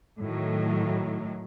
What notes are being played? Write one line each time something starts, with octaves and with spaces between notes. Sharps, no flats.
A2 D#3 F#3